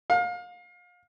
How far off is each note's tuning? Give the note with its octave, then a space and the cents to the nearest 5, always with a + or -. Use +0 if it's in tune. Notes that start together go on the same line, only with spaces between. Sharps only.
F5 +30